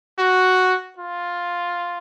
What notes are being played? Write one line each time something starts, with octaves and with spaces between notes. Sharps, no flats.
F#4
F4